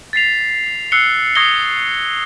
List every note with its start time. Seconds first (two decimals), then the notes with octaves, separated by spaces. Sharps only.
0.13 A6 B6 C7 F7
0.92 E6 F#6 C7 C#7 G7
1.35 C#6 D#6 G#6 A#6 C7 G7